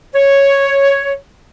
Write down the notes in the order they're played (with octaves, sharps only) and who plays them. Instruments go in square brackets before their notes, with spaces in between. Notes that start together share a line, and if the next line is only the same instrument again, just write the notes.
[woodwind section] C#5